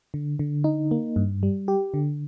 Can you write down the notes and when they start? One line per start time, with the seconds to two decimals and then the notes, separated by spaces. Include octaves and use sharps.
0.14 D3
0.39 D3
0.64 D#4
0.91 A#3
1.16 G2
1.43 G3
1.68 G4
1.94 D3